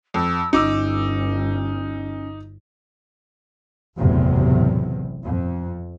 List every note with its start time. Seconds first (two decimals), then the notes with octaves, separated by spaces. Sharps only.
0.14 F2 E6
0.53 G1 C#4 D#4 D6 E6
3.97 F#1 B1 E2 A2 C3
5.22 F2